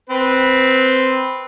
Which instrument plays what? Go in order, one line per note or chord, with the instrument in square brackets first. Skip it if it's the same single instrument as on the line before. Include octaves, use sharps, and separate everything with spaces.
[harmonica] C4 B4